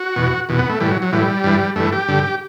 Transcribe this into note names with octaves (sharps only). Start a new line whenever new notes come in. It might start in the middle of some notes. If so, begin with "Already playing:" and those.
Already playing: F#4
E2 B2
E2 B2
B3
A3
A2 E3 G3
F#3
F#3
A2 E3 G3
G2 E3
G2 E3 A3
G4
G2 D3